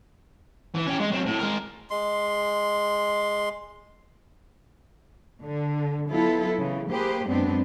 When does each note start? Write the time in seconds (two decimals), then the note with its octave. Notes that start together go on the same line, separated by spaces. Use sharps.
0.75 E3
0.87 C#4 G4
1.00 G#3
1.12 F#3 C4
1.26 A2
1.39 G#3 A#4
1.90 G#3 C6
5.44 D3
6.09 F#3 B3 E4 F4 A4
6.58 C#3 E3
6.89 A#3 G4 G#4 B4 C5
7.27 F#2 G#3 B3 C4 D4